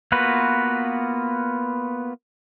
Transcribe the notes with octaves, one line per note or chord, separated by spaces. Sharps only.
A#3 B3 F4 F#4 B4